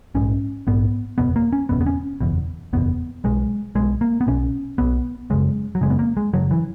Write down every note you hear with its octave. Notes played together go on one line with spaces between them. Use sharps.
A#1 G#2 C#4
A#1 G#2 B3
F#1 E2 B2 B3
A#3
C#4
F#1 E2 B2 B3
B3
C#4
F#1 E2 B2
F#1 E2 B2 B3
B1 B2 G#3
B1 B2 G#3
A#3
B3
B1 B2 C#4
B1 B2 B3
F#1 F#2 C#3 G#3
F#3
F#1 F#2 C#3 G#3
B3
A#3
G#3
F#1 F#2 C#3 F#3
E3